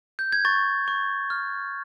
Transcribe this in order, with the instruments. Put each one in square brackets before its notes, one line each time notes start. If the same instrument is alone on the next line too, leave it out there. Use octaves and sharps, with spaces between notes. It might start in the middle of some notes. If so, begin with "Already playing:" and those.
[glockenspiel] G6
G#6
C#6 A6
C#6
F6